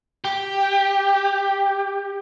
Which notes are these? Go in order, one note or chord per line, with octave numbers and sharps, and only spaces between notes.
G4